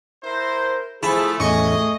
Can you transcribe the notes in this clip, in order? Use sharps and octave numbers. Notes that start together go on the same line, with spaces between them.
E4 A#4 C5
F3 A3 E4 G#4 A5
E2 A2 A3 C#4 G#4 D#5 C#6